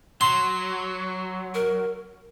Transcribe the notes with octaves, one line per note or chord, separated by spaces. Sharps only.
F#3 C6
A#4